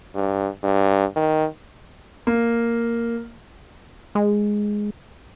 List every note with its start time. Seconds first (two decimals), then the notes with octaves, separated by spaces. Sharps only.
0.15 G2
0.63 G2
1.16 D#3
2.27 A#3
4.15 G#3